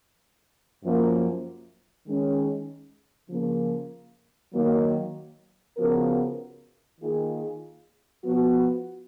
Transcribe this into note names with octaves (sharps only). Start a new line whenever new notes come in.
F#2 F3 A#3
D#3 G#3 C#4
C#3 F3 A#3
D#3 F#3 A#3
C#3 F3 B3 F#4 A#4
D#3 A#3 F4 G#4
F3 B3 F#4